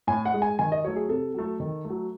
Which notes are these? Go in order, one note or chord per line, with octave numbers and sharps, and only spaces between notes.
A2 G#5
F#5
G#3
G#5
D#3 G#5
D#5
F#3 A3 C#5
G#4
C3 A4
F#3 A3
D#3
A3
F#3